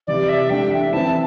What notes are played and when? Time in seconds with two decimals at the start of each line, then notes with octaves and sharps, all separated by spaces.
0.07 C3 E3 G3 E4 D5
0.29 E5
0.50 E3 A3 D4 G4 G5
0.71 E5
0.92 E3 C4 E4 A5